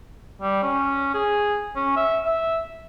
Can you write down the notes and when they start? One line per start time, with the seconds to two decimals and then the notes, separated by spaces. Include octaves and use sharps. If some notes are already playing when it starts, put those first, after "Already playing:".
0.42 G3
0.63 C#4
1.14 G#4
1.76 C#4
1.97 E5
2.25 E5